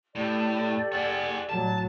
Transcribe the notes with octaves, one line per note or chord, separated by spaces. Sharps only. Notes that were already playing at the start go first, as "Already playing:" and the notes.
A2 G4 A4 D5
G#4 F#5
A2 F#3 A5